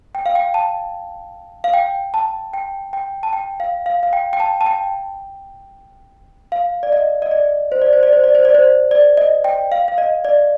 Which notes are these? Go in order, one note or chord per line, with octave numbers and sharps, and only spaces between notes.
G5
F5
G5
A5
F5
G5
A5
G5
G5
A5
G5
F5
F5
F5
G5
G5
A5
A5
G5
F5
D5
D#5
D#5
D5
C5
D5
C5
D5
C5
D5
C5
D5
C5
D5
D#5
G5
F5
F5
D#5
D5